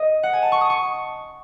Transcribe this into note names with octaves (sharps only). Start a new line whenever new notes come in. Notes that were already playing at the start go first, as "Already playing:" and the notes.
Already playing: D#5
F#5
G#5
A5
C#6
D#6
C#6